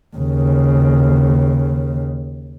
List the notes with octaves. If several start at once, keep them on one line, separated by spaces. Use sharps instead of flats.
D#2 C#3